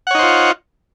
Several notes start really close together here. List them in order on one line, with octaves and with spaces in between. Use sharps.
F#5 C#5 D#4 C5 F4